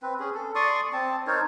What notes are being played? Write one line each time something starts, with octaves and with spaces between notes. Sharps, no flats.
C4 B4
C#4 G#4
A4
D5 C6 C#6 D#6
C4 A5
D#4 A#4 C5 C#5